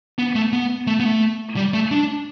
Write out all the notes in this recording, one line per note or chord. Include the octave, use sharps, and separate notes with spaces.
B3
A3
B3
A3
B3
A3
G3
A3
D4